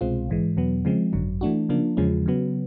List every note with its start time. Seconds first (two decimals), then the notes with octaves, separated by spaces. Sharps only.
0.01 C2 B2 G#3 C4 F4
0.28 A#1 G#2 E3 G#3
0.57 E2 B2 F#3 B3
0.85 C#3 F3 G#3 C4
1.13 G#1 F#2 D3 F#3
1.41 E3 A3 D4 F#4
1.69 C#3 F3 A#3 D4
1.97 E2 C#3 F3 G#3 C#4
2.26 C#3 F#3 B3